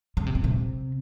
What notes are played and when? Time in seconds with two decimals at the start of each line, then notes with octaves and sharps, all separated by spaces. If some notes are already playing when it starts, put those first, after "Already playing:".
0.17 C#3
0.26 C3
0.35 A#2
0.44 C3